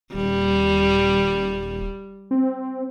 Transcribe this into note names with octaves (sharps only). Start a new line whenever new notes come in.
D#1 G3
C4